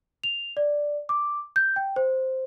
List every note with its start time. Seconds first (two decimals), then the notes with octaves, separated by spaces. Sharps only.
0.23 F7
0.57 D5
1.09 D6
1.56 G6
1.76 G5
1.96 C5